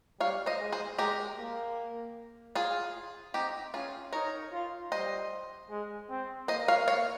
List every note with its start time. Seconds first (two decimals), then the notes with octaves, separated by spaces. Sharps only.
0.20 G3 C#5 F5
0.46 C5 D#5
0.60 G#3
0.72 G#4 C5
0.98 G#3 G4 A#4
1.38 A#3
2.55 F4 G#4
3.34 C4 D#4 G4
3.74 C#4 F4 G#4
4.13 D#4 A#4 C#5
4.52 F4
4.92 G3 C5 D#5
5.70 G#3
6.10 C4
6.48 A#3 C5 D#5
6.68 C#5 F5
6.88 C#5 F5